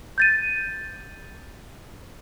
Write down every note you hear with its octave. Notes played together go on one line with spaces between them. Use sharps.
G6 A6 D#7